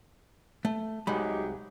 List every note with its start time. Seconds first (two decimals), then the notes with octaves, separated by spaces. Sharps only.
0.65 A3
1.07 C2 F#3 G#3 D#4 G4 B5